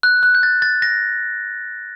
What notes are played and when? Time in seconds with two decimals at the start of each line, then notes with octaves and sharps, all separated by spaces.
0.03 F#6
0.23 F#6
0.35 G6
0.43 A6
0.62 A6
0.82 A#6